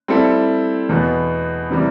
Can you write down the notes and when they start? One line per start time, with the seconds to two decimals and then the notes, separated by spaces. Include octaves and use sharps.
0.08 G3 C4 E4 A4
0.89 E2 B2 B3
1.70 C3 E3 G3